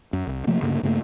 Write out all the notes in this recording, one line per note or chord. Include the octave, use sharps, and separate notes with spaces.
F#2
C2
C3 F3 A3 A#3
D2 G2 C#3 A#3
G2 C#3 A3 A#3